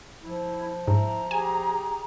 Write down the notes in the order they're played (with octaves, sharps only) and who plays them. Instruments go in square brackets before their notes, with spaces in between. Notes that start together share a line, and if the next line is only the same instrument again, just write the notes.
[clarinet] F3 [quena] E4
[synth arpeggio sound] G#2 [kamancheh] E4 [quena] A#5
[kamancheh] G4 G#4 [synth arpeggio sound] G#5